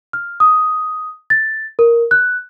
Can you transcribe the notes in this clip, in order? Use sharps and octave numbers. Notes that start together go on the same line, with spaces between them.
F6
D#6
A6
A#4
F#6